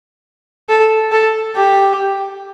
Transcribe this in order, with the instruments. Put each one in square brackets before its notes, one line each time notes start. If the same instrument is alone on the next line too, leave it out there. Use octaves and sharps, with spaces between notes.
[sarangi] A4
A4
G4